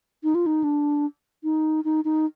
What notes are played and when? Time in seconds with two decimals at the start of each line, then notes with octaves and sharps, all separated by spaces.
0.24 D#4
0.35 F4
0.46 D#4
0.64 D4
1.44 D#4
1.85 D#4
2.05 D#4